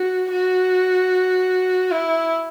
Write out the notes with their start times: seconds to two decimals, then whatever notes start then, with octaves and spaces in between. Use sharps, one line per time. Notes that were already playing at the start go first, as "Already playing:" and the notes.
Already playing: F#4
0.31 F#4
1.91 E4